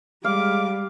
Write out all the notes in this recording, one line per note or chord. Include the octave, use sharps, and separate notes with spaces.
G3 G#3 F5 D6